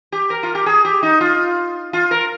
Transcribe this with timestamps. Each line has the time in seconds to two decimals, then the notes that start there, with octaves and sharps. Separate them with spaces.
0.12 G4
0.30 A#4
0.43 F4
0.55 G4
0.66 G#4
0.85 G4
1.03 D#4
1.21 F4
1.93 F4
2.11 A#4